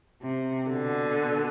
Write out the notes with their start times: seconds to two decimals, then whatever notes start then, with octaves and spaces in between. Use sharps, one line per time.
0.23 C3
0.70 B2 D3